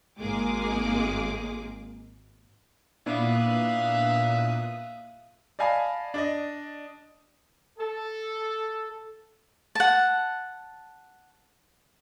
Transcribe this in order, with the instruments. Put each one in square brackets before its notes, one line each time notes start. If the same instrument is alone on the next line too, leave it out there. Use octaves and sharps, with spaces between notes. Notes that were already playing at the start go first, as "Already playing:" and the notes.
[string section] G#1 G#3 A#3 G#4 D6
[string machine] A#2 D#6 F#6 [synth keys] B3 D4 E4 [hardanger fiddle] E5 F5
[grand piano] D5 D#5 F5 G#5 A5 B5
D4 D5 D#5
[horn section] A4
[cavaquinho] F#5 A5